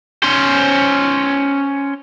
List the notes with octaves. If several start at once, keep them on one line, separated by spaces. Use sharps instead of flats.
C#4 C5